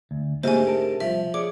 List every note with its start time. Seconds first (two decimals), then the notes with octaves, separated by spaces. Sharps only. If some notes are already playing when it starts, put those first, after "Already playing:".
0.11 D2
0.44 D2 G#2 C3 A#3 F#4 C5 E5 G#5
0.67 A#4 A5
1.00 C2 F3 E5
1.34 G#4 C#5 D5 D6